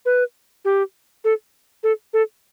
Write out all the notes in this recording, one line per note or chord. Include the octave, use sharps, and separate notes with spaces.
B4
G4
A4
A4
A4